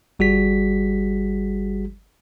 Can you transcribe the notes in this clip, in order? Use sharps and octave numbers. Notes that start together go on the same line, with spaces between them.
G1 G3 F#4 G#4 B6